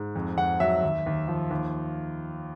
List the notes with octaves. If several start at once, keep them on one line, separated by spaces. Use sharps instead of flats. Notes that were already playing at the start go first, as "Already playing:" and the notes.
Already playing: G#2
F2
F2 F#5
F#3 E5
D#2
D#2
F3
D#2